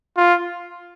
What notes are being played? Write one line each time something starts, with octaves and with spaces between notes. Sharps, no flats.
F4